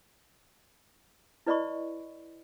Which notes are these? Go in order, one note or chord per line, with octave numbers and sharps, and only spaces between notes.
E4 B4 D5 D#5 B5 C#6